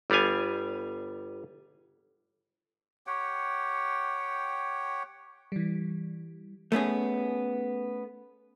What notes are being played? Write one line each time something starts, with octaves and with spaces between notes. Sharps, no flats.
G1 G3 B3 F5 G#5
G4 C#5 F#5 G5
E3 G3
A3 B3 C#4 G#4